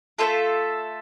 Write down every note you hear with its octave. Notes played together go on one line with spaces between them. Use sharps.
A3 C4 F4 A4 E5